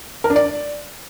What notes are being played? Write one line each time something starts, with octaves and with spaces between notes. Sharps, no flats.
A#4
D4
D5